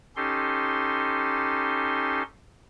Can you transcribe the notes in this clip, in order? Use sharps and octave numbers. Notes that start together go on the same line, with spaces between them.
C#4 D#4 G4 A4 C6